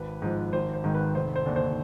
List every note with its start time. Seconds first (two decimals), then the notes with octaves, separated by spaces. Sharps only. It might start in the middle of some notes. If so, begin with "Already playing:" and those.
Already playing: G#1 B4
0.22 G#2 F3
0.53 G#1 C5
0.74 C5
0.84 G#2 D#3
0.94 B4
1.15 F1 C5
1.36 C5
1.46 D#2 D3
1.56 C5